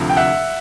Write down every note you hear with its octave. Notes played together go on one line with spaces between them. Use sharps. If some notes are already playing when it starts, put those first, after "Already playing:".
Already playing: D2 C3 F3
G5
E5 F#5